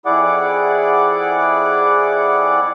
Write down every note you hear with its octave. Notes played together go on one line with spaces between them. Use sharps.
F2 E4 G#4 D5 F#5 D6